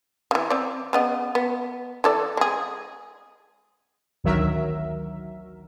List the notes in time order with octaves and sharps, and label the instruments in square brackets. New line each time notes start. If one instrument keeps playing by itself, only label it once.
[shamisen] C#3 E3
C4 D5
C#3 B3 D#5
B3
E3 A4 D5
G#3 G#4
[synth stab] A1 D2 D#3 F#3 A#4 E5